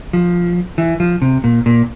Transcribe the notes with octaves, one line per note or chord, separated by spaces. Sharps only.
F3
E3
F3
C3
A#2
A#2